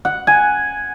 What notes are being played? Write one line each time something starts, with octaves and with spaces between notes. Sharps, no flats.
F#5
G#5